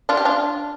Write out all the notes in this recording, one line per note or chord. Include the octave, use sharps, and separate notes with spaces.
D4 F4
G4
D4 F4